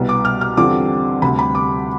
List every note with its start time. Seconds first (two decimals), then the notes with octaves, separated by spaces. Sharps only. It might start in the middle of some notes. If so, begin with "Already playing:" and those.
Already playing: C2 B2 B3
0.09 D6
0.25 F6
0.41 F6
0.57 E2 D3 G3 C4 F4 D6
1.22 D2 C3 G3 B5
1.39 B5
1.55 D6